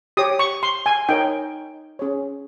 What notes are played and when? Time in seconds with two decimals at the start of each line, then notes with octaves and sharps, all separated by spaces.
0.17 G4 C#5 D#6
0.39 C#6
0.63 C6
0.86 G#5
1.09 D#4 A#4 C#5 G5
1.99 C#4 G#4 C#5